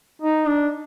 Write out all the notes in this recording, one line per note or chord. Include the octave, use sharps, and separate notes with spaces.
D#4
D4